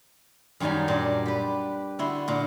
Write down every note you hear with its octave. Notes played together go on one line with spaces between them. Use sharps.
F#2 D#3 F#3 G3 D#4 G#5
A#2 D4
G4 B4
D3 E4 F#4 C6
A#2 D3